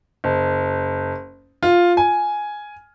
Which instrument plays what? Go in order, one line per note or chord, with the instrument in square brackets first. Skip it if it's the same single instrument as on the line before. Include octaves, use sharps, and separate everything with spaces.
[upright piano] F#1
F4
G#5